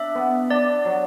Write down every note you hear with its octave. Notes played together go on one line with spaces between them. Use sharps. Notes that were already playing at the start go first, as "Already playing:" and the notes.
Already playing: D4 E5
B3
D4 D5
F#3